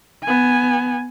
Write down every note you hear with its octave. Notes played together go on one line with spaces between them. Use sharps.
B3 G#5